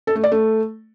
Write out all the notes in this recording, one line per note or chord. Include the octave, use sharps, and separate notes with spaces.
A4
A3
D5
A3